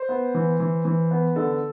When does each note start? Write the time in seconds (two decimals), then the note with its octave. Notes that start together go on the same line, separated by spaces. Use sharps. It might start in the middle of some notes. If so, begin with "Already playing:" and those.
Already playing: C5
0.09 B3
0.34 E3
0.60 E3
0.85 E3
1.11 B3
1.36 D3 A4